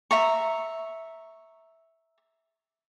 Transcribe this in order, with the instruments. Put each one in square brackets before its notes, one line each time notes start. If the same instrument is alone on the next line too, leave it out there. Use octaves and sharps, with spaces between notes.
[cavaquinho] E5 A#5 C#6